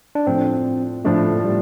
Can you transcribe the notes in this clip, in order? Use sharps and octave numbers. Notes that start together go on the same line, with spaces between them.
D4
A2 F3 C4 D4
A2 F3 A3 D4
A3
G3